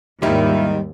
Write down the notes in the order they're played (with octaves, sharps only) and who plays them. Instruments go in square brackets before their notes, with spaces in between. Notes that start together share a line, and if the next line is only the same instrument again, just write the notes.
[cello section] D#2 G#2 [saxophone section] D#3 [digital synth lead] G3 [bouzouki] E4 F4